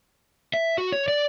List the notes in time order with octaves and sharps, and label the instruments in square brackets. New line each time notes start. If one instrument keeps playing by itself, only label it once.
[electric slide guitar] E5
F#4
C#5
D5